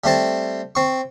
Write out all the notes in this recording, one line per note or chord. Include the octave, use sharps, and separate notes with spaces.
G3 A3 C4 A5
C4 C#6